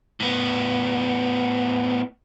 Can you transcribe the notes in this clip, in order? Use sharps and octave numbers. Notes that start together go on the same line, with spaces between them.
A2 B3